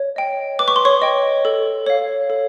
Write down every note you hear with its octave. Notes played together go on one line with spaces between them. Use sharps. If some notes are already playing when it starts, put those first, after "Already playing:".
Already playing: C#5
D#5 G5
B4 D6
C#6
C6
C#5 C#6
D#5 G5
A4
C#5 F5
A4